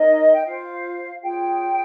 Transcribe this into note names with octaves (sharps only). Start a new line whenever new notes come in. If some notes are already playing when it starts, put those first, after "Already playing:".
Already playing: D#4 A#4 C#5 D#5
G5
F4 C5 F5
F4 G#4 C#5 G5